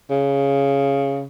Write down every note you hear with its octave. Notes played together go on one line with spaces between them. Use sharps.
C#3